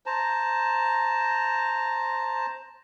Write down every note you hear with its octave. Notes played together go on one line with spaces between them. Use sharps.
C5 A5 A#5